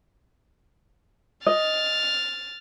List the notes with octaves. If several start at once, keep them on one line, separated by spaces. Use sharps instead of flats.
D#5 F6 A6